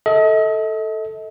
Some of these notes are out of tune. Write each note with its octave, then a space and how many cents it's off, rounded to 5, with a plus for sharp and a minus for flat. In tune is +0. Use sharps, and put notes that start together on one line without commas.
A4 +0 D#5 +40